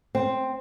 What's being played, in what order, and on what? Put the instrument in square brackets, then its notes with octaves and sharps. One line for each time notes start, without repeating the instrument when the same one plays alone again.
[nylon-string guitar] C4